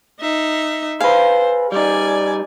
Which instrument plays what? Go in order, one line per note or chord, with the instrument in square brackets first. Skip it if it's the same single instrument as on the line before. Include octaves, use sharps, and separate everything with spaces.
[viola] D#4 E5
[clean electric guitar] G#4 B4 [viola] C5 [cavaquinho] F5
[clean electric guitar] G3 D#4 [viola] D5 G#5